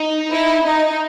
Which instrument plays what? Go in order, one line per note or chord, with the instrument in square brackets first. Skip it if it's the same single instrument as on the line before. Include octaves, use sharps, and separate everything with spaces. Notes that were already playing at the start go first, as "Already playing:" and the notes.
Already playing: [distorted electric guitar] D#4
[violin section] E4
D#4